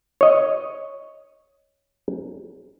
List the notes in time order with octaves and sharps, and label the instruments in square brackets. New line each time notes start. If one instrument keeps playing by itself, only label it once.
[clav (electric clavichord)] C#5 D#5